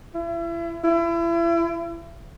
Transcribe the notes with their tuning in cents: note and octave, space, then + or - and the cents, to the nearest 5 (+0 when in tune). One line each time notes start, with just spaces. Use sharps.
E4 +35
E4 +35